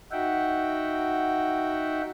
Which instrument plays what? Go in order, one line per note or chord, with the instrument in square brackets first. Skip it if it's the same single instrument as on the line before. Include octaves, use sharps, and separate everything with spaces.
[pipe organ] D#4 F#4 E5 F#5 G5